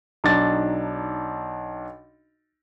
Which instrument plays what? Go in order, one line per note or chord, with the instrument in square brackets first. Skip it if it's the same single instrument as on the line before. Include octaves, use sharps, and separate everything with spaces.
[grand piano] B1 D4 D#4 A6